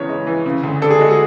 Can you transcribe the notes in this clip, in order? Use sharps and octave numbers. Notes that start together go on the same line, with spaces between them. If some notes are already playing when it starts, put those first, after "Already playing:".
Already playing: E2 C#3 C#5
G#3
E3
C#3
D2
D4 A4
G#4
G#3 F#4
G#4